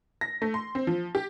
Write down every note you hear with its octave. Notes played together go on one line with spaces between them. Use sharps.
A#6
A3
C6
C4
F3
G4